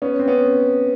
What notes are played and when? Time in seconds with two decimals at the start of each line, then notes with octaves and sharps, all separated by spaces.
0.02 B3 C#4
0.19 C4
0.28 B3 C#4